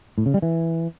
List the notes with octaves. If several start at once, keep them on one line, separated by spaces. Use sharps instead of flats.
A2
C#3
G3
E3